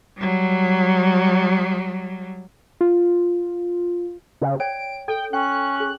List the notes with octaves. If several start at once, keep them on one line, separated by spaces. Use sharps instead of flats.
F#3 G3
F4
C#3
C#5 D5 G5 D7
A4 G5
C#4 G5 F#6
G#4 C#6